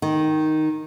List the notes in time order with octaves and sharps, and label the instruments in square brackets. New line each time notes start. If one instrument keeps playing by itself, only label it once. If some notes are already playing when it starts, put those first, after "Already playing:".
[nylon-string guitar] D#3